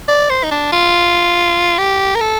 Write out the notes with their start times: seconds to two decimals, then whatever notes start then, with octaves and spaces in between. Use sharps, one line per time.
0.08 D5
0.30 C5
0.43 D#4
0.51 D4
0.72 F4
1.78 G4
2.15 A#4
2.21 A4